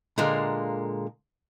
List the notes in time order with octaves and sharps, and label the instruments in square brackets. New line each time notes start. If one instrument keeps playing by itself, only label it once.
[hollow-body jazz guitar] A#2 D3 G#3 A#3